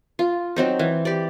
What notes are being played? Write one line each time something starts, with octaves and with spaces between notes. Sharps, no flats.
F4
F#3 C4 D#4
E3
G4 D5